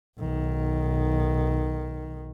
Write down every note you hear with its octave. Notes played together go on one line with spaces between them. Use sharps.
B1 D#3